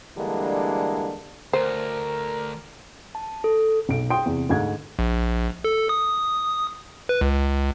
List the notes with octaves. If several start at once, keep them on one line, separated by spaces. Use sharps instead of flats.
D3 E3 G3 G#3 A#3 D4
D2 A#4 C5
A5
A4
B1 D7
G5 C6 D#6 D7
E2 C3
D2 G#2 G#3 G#6
A#1
A4
D#6
B4
C#2